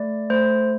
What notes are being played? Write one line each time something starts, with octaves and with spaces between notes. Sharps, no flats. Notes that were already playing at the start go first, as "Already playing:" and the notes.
Already playing: A3 D5
A3 C5